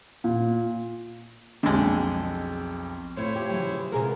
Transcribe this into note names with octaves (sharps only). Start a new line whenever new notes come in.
A#2
B1 F2 D3 G#3
A2 A3 E4 F4 C5 C#5
G4 A4
C#3 E3 F#3
B2 G#4
C3 G#3 B3 G#4 A#4